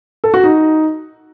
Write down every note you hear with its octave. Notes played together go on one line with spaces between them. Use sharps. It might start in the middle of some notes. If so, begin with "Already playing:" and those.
A4
F#4
D#4